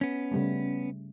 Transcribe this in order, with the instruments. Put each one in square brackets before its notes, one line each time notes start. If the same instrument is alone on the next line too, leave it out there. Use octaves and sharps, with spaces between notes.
[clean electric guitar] B3 C#4
[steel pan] C#3 G3 A3